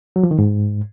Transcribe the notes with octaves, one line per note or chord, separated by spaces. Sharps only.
F#3
F3
D#3
G#2